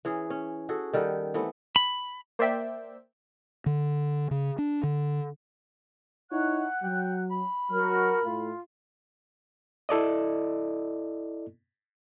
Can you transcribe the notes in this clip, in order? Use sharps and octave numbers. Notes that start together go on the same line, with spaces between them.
E3 C#4 G#4
C#4
F#4 G#4 A4
D#3 G3 A4 F#5
E3 A3 B3 C4
B5
A#3 C5 D5 E5 G5 B6
D3
C#3
D4
D3
D#4 E4 C#5 F#5 F#6
F#3 G5
B5
F#3 F#4 A#4 F6
A2 F4
E4 A4 D5 D#5